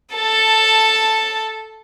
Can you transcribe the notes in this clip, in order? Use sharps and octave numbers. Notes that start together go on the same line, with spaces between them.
A4 A5